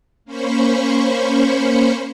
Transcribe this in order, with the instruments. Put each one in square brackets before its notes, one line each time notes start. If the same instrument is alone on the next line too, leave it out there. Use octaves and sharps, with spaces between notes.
[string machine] A#3 C#4 C5 B5 C#6